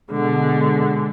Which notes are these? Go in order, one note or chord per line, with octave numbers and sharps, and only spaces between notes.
B2 D3 G#3